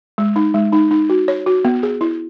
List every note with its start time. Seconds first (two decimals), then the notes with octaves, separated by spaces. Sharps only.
0.18 G#3
0.36 D#4
0.54 G#3
0.73 D#4
0.91 D#4
1.10 F#4
1.28 C#5
1.46 F#4
1.65 B3
1.83 G#4
2.01 E4